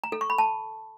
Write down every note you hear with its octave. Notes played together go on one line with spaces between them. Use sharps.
A#5
A4
C#6
B5
A5